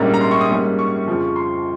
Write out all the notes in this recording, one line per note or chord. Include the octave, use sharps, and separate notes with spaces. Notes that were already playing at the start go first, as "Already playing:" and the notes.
Already playing: A#1 G#2 G3 A#3 C#4 A#5
A#5
C6
C#6
D#6
G#2 G3 A#3 C#4
C#6
F2 C#3 F3
C6